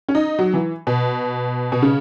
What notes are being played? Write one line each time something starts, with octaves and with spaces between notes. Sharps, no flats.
C#4
D#4
F#3
E3
B2
B2
C#3